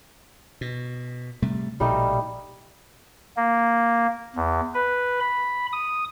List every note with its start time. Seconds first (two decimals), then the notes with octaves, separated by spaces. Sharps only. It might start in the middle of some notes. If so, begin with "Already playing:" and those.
0.61 B2
1.42 C3 G3 A3
1.80 A#1 B2 G3 A3 D#4
3.37 A#3
4.36 E2
4.74 B4
5.20 B5
5.73 D#6